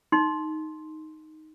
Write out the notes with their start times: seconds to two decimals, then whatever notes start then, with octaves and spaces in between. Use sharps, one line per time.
0.12 D#4 C6